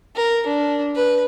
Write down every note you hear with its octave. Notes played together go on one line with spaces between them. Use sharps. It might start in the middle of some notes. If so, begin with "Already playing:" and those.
A#4
D4
B4